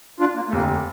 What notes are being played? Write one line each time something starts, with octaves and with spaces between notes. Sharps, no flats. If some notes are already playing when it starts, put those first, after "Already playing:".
D4 F4
A#3
A3
F1 D#2 D3 A#3